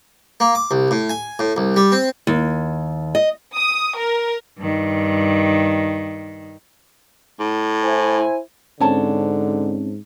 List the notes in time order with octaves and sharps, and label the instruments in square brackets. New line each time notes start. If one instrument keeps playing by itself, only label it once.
[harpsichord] A#3
D6
C2
A2
G#5
A2
C2
G3
C4
[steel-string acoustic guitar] D#2
D#5
[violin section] D#6
A#4
[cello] G2 D#3
[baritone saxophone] A2
[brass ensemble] E4 C5 G#5
[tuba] G#2 [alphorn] D3 [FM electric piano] C4 C#4 [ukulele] C#5 A5